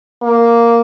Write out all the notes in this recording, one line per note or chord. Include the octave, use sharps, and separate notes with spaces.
A#3